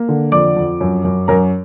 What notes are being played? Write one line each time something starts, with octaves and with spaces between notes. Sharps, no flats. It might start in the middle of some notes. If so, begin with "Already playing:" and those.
Already playing: A#3
D3
F2 D5 D6
F2
F#2
F#2
F#2 A#4 A#5